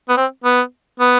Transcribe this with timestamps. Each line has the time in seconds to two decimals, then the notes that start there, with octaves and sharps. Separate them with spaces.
0.09 B3
0.17 C4
0.44 B3
1.00 B3